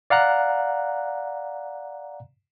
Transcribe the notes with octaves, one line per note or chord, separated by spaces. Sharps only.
D5 F5 F#5 A#5 F#6